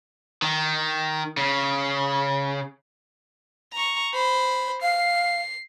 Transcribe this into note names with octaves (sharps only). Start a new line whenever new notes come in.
D#3
C#3
A#5 C#6
C5 B5
F5 C7